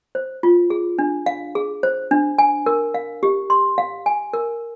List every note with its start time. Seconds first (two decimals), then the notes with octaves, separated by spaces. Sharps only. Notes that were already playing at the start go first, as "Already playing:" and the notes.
0.15 C5
0.43 F4
0.70 G#4
0.99 D4
1.26 F5
1.55 G#4
1.83 C5
2.11 D4
2.38 G#5
2.66 A#4
2.94 F5
3.23 G4
3.50 C6
3.78 F5
4.06 G#5
4.33 A#4